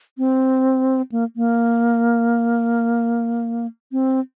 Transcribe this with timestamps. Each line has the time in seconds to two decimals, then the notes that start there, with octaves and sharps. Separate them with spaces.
0.18 C4
1.12 A#3
1.36 A#3
3.92 C4